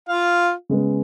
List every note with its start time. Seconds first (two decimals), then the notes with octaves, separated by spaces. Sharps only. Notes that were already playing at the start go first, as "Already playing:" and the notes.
0.09 F4 F5
0.70 C#3 G#3 B3